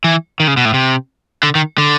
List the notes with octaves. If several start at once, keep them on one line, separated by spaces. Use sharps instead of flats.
E3
D#3
C#3
B2
A2
C3
D3
D#3
D3